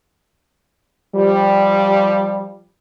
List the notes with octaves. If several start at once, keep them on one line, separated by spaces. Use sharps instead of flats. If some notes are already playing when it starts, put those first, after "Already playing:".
F3 G3